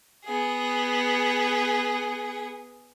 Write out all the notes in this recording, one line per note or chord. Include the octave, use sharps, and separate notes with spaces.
B3 G#4